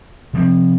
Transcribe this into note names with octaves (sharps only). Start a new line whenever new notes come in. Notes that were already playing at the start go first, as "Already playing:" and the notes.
C3 F3 C4